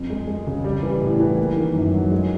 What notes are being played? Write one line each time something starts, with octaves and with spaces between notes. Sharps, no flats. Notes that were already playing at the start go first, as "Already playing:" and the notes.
Already playing: F2
G#3
G#3
C#3
G3
E3
A2
E3
A#3
D#3
F#2
F#3
G#3